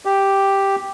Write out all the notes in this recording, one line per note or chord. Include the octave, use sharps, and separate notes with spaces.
G4